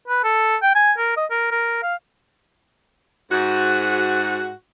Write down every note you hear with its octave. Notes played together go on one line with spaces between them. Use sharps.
B4
A4
G5
G#5
A#4
D#5
A#4
A#4
F5
G#2 F#4